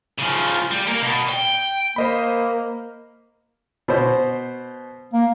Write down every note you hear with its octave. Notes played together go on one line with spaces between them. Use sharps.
C#3 F3
G3
A#3 A#4
B2
G5
A#3 C5 D#5 B5
B2 C5
A#3